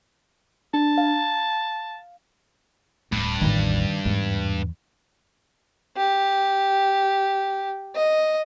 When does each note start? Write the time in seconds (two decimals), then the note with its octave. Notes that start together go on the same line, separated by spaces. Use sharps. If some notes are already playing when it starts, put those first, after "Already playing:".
0.74 D4 A5
0.98 F5
3.12 D1 G2
3.42 A1 E2 D#3
4.06 E2 G#2
5.98 G4
7.96 D#5